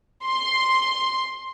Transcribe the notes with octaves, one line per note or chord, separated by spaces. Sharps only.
C6